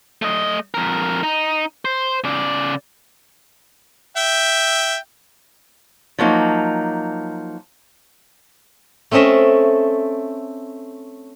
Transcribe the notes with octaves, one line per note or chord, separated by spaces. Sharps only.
A3 D#5
F2 A#4
D#4
C5
C#3 D5
E5 G5
F3 F#3 A#3 D#4
A3 C4 C#4 A4 D#5 E5